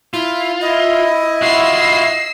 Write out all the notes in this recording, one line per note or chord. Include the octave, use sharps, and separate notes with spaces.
E4 F4
E4 D#5
F4 F#4 E6 C7